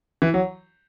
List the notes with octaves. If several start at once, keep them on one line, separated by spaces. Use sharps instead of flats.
E3
F#3